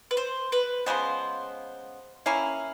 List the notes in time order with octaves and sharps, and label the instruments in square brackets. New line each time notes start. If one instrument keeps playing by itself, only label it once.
[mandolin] B4
C5
B4
[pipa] C#3 F3 G#3 B3 [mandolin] C5
[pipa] A#3 C#4 E4 [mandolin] F5